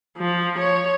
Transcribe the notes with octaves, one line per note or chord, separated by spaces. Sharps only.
F3
C#5